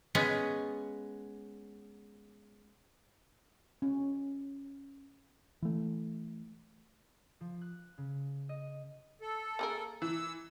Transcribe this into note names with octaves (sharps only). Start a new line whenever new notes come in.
G#3 B3 C#4
C#4
E3 A3
F3
F#6
C#3
D#5
A4
A#3 G#4 A#4
E3 E6